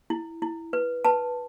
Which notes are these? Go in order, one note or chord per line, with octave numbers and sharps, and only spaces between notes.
E4
E4
B4
B4 A5